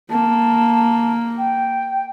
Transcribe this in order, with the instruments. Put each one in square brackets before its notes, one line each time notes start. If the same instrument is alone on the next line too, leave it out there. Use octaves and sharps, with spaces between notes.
[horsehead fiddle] A#3 [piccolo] A5
[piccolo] G5